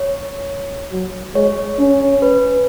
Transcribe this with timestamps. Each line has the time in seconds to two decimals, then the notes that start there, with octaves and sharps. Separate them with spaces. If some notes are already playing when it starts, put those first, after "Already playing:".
Already playing: C#5
0.91 F#3
1.35 G#3 C#5
1.79 C#4
2.22 B4